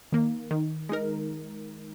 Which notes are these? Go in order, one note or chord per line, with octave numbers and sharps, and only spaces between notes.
D#3 A#3
D#3
G#3 D#4 A#4